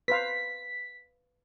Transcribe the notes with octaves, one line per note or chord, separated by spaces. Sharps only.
B4 C5 F5 B6